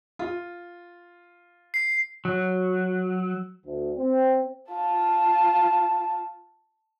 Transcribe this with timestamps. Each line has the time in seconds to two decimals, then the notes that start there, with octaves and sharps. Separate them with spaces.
0.19 F4
1.74 C7
2.25 F#3
3.66 D2
3.97 C4
4.72 F4 A5